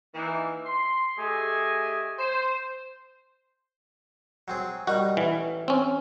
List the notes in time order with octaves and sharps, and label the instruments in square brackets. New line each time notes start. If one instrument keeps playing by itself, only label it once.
[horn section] E3 A#3 D#4
C6
A3 G4 G#4 D#5 G#5
C5
[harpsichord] F#3 C4 G#4
[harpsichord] D#3 G3 D#4 [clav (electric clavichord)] F#4
[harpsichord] A1 [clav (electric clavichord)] E3
[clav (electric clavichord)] C4 C#4